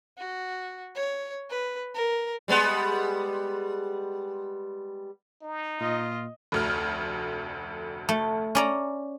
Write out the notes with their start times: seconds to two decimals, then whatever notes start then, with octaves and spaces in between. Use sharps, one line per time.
0.18 F#4
0.95 C#5
1.50 B4
1.95 A#4
2.48 G3 G#3 B3
5.42 D#4
5.80 A#2 F4 D#5
6.52 F1 D2 F6
8.09 A3
8.55 C#4 D5 A#5